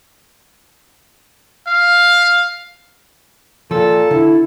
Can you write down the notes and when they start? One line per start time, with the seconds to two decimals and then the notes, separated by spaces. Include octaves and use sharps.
1.67 F5
3.71 A#2 F3 A4
4.11 D3 E4